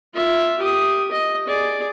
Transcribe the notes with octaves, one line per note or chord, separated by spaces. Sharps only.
F4 E5
G4 D#6
D#5
G#4 D5